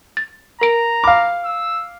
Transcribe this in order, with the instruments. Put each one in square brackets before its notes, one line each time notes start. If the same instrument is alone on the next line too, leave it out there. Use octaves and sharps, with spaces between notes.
[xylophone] A6
[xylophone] A#4 D7 [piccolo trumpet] A#5
[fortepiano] F5 D6 [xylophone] B5
[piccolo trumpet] E6